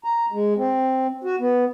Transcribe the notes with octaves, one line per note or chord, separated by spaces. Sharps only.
A#5
G#3
C4
F#4
B3